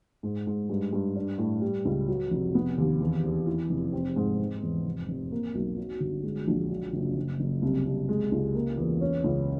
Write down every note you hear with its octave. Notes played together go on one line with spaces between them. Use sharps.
G#2
G#2
G2
G2
D4
A2
G3
C#2
F#3
F1
B3
D#2
E2
E2
E3
F1
C4
G#2
C4
E2
F1
F1
A#3
B1
F#3
G1
G#3
A#1
F#3
F#1
F#1
F#1
C2
C2
G#3
C#2
A#3
E2
C#4
C#2